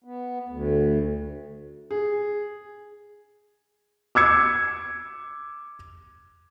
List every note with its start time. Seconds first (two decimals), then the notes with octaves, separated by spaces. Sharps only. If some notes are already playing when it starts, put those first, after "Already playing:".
0.04 B3
0.48 D2
1.91 G#4
4.15 D6 E6 G#6 C#7